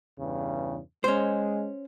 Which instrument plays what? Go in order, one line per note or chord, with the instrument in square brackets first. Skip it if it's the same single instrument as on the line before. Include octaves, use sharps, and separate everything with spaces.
[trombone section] E2 G2 C#3
[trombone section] G#3 [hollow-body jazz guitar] C#4 C5